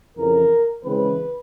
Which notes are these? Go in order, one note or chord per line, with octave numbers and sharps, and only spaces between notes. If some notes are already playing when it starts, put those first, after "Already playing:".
F2 C#3 E3 A#4
C#3 E3 G#3 C4 B4